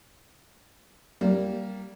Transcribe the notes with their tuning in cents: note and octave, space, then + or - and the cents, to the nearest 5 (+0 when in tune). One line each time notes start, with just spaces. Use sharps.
G3 -15 A#3 +0